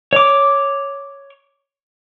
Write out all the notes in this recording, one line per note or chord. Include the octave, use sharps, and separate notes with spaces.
C#5 D6